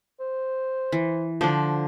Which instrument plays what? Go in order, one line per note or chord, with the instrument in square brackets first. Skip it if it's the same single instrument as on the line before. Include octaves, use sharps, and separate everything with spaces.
[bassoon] C5
[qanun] E3
[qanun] D3 C5 D6 [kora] F3 D4